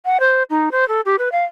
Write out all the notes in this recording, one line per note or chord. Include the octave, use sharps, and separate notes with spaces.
F#5
C5
D#4
C5
A4
G4
B4
F5